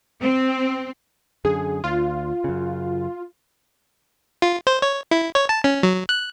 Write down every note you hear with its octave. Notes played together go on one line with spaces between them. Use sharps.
C4
F#2 D3 G#4
D2 F4
F#2 C#3
F4
C5
C#5
E4
C#5
A5
C#4
F#3
F#6